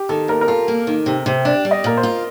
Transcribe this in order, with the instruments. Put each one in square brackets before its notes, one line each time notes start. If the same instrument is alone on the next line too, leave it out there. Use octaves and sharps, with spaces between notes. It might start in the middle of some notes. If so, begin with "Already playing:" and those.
Already playing: [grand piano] G4
[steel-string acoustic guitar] D#3 [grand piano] A4
[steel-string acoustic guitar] D#2 [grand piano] A#4
[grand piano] A#4
[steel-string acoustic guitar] F4 [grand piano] A4
[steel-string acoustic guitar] A#3
D#3
C3
C3
[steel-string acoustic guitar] D4 [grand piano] D5
[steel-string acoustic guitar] G3
[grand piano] D#5
[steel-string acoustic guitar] A#2 [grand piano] A#4
[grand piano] C5
[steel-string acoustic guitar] F4